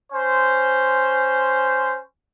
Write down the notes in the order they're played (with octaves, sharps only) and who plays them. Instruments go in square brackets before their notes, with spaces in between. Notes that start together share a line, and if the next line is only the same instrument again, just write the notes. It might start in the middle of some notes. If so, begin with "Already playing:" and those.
[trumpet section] C#4 C5